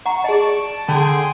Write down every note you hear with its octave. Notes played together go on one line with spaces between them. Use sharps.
F#5 A#5 C#6
G#4 D5 D#5 A5
D3 G#4 G5 A5 C6